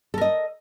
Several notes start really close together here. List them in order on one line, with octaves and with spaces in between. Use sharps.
A4 A#4 D#5